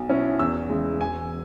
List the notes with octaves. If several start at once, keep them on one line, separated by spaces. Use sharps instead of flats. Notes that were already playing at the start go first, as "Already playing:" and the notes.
Already playing: B1
B2 F#3 C#4 E4
E2 E6
C#3 E3 G#3
E1 G#5